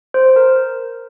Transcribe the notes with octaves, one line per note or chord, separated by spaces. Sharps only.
C5
A#4